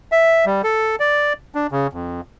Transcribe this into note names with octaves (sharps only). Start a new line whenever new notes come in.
E5
G3
A4
D5
D4
C#3
F2